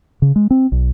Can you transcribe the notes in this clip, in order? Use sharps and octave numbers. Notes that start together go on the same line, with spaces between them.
C#3
G#3
C4
B1